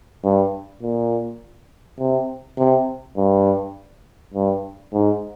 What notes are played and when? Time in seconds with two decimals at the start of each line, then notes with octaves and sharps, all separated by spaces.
0.24 G2
0.82 A#2
1.99 C3
2.58 C3
3.17 G2
4.34 G2
4.93 G#2